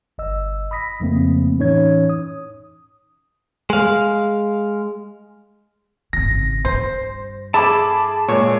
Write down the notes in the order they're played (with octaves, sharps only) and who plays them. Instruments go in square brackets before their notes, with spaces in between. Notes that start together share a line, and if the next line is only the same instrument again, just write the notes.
[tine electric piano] G1 D#5 E6
B5 D#6 A#6 B6
F2 C#3 F3 A3 A#3 C4
A2 E3 C#4 D#4 C#5 G#6
D#6
[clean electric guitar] G#3 F5
[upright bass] G#1 C#3 [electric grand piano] A#6
[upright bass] G2 [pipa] C5
[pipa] E4 A4 [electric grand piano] G#4 B5 D6 [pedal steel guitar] A5
[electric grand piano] A#2 G#3 [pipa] C#5